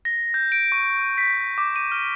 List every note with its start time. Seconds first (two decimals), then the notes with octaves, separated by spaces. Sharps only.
0.05 A#6
0.34 G6
0.52 D7
0.72 C#6
1.18 B6
1.58 D6
1.76 D#7
1.92 F6